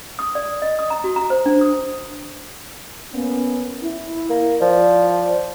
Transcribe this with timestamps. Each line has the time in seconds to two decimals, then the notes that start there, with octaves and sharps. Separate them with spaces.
0.19 D#6
0.35 D5
0.62 D#5
0.79 D#6
0.90 A#5
1.04 F#4
1.16 A#5
1.30 C5
1.46 D4
1.61 D#6
3.13 A#3 B3 C#4
3.83 E4
4.30 A#3
4.61 F3 D5